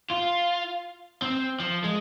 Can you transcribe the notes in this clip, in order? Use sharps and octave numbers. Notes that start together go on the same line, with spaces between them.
F4
C4
F3
G#3